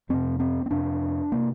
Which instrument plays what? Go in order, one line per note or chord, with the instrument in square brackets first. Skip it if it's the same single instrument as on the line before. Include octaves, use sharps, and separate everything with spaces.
[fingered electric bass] F2 C3 C4
C4
C4
F2 C3 D4
C3 A#3